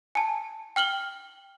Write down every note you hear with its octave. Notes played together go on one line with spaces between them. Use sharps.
G#5 A5
G5 F6 F#7 G7